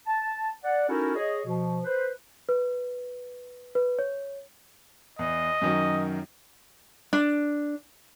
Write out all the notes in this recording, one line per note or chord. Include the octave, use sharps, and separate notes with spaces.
A5
D5 F#5
C#4 D#4 E4 F#4 A4 A#4
G#4 C#5 D#5
B2 F3
B4 C5
B4
B4
C#5
E2 D#5
F#2 D#3 F#3
D4